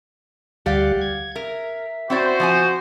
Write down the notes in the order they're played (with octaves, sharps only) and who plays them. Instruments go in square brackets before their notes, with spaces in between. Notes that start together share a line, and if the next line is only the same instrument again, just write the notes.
[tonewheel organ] D2 G3 F#5 [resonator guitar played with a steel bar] G4 D5 F5
[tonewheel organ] G#6
[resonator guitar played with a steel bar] A#4 [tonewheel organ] E5
[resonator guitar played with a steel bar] C4 E4 D5 [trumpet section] F#4 C5
[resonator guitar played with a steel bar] F3 C4 G#5